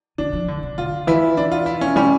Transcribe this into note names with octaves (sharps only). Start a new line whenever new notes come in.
D3 D4
F3
D3
C#3
D3 F4
E3 E4
D4
F4
E4
C#4
G3 C#4